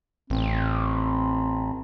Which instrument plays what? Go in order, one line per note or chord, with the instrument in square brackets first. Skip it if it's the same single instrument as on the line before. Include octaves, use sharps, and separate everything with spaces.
[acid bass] A1 [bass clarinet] C4